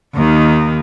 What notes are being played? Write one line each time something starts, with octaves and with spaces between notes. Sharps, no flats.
D#2 D#3